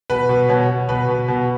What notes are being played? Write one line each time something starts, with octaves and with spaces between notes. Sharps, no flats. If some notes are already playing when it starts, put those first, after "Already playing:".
B2 B4
B2
B2 C#5
B2
B2 B4
B2
B2